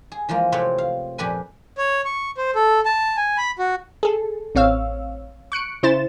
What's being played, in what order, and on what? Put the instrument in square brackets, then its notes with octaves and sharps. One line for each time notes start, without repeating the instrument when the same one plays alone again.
[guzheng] G#4
E3 F3 G#3 A#3
C3 A3 C4 B4 C#5
F5
F2 A#2 G4 B4 G#5
[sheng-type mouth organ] C#5
C#6
C5
A4
A5
G#5
B5
F#4
[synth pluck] G#4 A4
A1 C4 C#5 F5 E6
C#6 F#6 C#7 D7
C#3 E4 C5 A6 E7